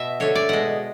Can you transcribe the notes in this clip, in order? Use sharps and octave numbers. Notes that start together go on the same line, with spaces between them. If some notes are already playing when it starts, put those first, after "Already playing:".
Already playing: B2 E5
D3 A3 C#5
D5
B2 G#3 F#5